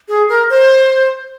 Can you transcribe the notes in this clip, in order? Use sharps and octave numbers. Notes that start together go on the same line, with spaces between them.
G#4
A#4
C5